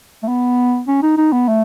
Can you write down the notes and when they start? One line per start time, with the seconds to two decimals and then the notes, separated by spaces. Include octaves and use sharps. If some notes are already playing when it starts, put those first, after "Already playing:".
0.23 A3
0.28 B3
0.88 C#4
1.02 D#4
1.18 D#4
1.32 B3
1.48 A3